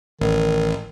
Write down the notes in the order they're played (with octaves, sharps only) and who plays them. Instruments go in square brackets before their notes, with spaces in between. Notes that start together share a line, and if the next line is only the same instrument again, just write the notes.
[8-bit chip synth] A1 [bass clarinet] D#3